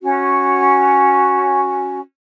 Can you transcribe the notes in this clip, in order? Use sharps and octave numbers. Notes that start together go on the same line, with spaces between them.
C#4 F#4